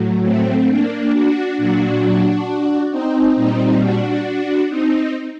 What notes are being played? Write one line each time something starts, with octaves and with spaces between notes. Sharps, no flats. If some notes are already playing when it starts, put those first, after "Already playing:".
Already playing: A2 F#3
A3 C4
A#3 D4
D4 F#4
A#2 F#3 D4 F#4
C4 D#4
A#2 G3 C4 D#4
D4 F#4
C4 D#4